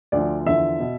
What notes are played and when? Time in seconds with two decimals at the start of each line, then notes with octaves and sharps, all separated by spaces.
0.12 D2 D3 F3 D5
0.46 E2 D3 F3 E5
0.79 B2